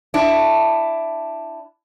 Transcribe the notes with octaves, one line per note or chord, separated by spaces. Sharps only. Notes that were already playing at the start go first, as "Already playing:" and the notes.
D4 E4